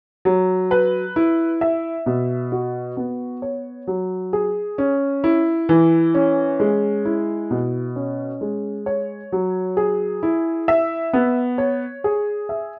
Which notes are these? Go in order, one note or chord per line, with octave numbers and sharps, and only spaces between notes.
F#3
B4
E4
E5
B2
F#4
B3
C#5
F#3
G#4
C#4
E4
E3
C#4
G#3
E4
B2
C#4
G#3
C#5
F#3
G#4
E4
E5
B3
C#5
G#4
E5